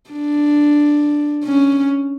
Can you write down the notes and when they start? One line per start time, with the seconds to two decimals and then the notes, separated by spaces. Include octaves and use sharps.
0.10 D4
1.44 C#4